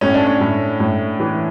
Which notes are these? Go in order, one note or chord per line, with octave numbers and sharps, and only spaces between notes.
A2 C#4
D4
C#4
A2
A2
E3